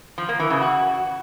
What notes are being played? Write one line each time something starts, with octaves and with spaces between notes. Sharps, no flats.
F3
A#3
E3
C#3
F#4